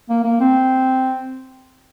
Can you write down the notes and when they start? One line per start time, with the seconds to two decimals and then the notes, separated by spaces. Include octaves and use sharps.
0.09 A#3
0.24 A#3
0.40 C4